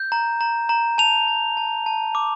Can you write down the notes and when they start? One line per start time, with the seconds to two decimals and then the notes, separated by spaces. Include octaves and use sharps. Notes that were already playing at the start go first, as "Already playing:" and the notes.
Already playing: G6
0.12 A#5
0.41 A#5
0.69 A#5
0.98 A5 F7
1.28 A5
1.57 A5
1.86 A5
2.15 D6